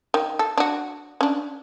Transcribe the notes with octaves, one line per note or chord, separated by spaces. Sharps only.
D#3
A4
D4 F#4
C#4 D4